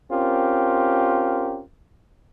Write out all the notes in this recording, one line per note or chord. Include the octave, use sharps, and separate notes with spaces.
C4 C#4 F4 G4 A#4